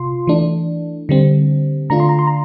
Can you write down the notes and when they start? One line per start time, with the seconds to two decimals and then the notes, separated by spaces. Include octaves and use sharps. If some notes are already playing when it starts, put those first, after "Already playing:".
Already playing: C3 F4 C6
0.27 E3 A3 D4
1.09 D3 G3 C4
1.90 D3 A3 D4 F4 A#5
2.00 C6
2.09 A#5
2.19 C6
2.27 A#5